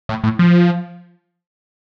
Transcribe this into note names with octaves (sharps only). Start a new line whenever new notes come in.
A2
A2
F3